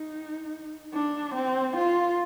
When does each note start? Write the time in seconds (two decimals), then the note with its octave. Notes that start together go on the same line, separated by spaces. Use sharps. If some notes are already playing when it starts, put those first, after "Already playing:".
Already playing: D#4
0.94 D4
1.34 C4
1.76 F4